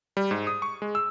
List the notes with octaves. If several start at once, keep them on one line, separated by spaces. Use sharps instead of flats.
G3
G#2
D#6
C#6
G#3
E6